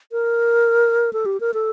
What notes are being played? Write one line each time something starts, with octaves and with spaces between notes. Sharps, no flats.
A#4
A4
G4
A#4
A4